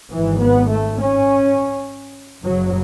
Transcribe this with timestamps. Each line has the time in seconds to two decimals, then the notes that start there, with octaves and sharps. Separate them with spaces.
0.13 G#1 G#2 E3
0.42 B3
0.71 A3
1.00 C#4
2.44 F#1 F#2 C#3 F#3